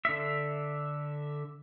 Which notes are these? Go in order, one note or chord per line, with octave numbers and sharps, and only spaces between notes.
D3 E5